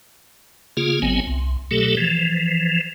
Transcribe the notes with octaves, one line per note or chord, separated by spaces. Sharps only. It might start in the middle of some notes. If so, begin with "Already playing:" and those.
C#3 A#3 F4 G#4
G#1 F#3 B3 C4 G#5
C2
B2 F#3 A3 G4 A4
E3 F3